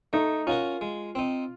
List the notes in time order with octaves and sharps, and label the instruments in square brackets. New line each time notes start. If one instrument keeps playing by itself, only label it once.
[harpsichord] A3 [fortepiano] D#4
[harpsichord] C#4 F#4 A#4 [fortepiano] F4
[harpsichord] G#3
C4 D#4